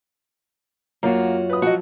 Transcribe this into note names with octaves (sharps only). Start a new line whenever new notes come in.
F#2 A#3 F4 F#4
B4 D#6
F3 F#3 F#4 D#5